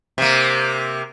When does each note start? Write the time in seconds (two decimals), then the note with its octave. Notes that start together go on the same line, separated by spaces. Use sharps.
0.18 C3 A#3